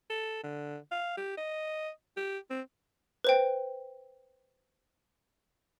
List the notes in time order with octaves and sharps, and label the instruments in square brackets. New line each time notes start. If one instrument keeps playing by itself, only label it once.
[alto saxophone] A4
D3
F5
G4
D#5
G4
C4
[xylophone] B4 C5 G5